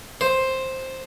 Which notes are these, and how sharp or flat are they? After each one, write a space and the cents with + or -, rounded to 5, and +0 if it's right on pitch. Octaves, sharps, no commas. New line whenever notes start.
C5 +5